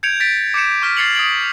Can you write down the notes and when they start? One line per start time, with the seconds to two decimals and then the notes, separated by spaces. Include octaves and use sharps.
0.03 G6 G#6 C#7 D7 F7
0.20 A6 B6 D7 F7
0.54 D6 G6 C#7 E7
0.82 C#6 F6 B6 E7
0.97 F6 A6 C7 C#7 F7 F#7
1.15 D#6 G#6 D7 F#7